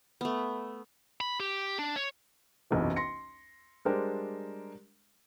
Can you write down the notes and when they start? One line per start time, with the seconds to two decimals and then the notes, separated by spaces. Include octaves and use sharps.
0.21 A3 B3
1.21 B5
1.40 G4
1.79 D4
1.96 C#5
2.71 F#1 B1 E2 C3 E3
2.96 C6 A#6 C#7
3.85 G3 G#3 D4 A#4 C5